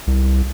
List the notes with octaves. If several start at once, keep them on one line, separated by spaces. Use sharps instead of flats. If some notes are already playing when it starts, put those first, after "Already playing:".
C2